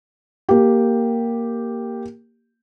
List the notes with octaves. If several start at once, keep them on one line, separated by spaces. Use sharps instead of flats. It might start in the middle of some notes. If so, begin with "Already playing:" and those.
A#3 G4